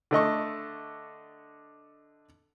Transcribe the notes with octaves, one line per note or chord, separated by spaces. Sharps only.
D3 A3 D#5 C#6